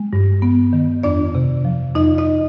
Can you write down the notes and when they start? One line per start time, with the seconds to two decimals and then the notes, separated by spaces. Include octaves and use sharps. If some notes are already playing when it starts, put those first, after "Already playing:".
Already playing: G#3
0.13 G2
0.42 B3
0.73 D#3
1.03 F2 D4 D5
1.35 C3
1.65 F3
1.95 F2 D#4 D#5
2.18 D#4 D#5